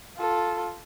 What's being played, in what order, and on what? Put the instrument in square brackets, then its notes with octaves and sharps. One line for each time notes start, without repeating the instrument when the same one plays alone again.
[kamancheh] F4 A4